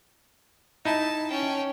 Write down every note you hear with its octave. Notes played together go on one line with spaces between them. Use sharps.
D#4 E4 A5
C#4 G5